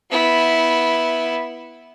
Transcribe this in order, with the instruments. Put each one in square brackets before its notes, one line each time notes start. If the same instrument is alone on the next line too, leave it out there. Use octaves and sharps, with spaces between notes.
[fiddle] B3 E4